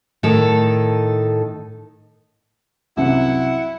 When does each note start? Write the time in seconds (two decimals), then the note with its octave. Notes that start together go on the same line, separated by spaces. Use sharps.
0.23 A2 D#3 D#4 A4
2.97 C2 F#2 C3 E4 F#5